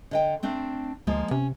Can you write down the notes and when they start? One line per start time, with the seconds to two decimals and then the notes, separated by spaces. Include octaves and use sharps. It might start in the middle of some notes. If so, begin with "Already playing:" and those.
0.11 D3 D#5 G5
0.43 A3 C4 D4
1.07 D2 F3 G#3 A#3
1.31 C3 C#4